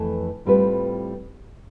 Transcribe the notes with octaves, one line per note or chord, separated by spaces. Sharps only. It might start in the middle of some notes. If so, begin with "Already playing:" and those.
Already playing: F2 E3 A3 E4 B4
A2 G3 C4 F4 B4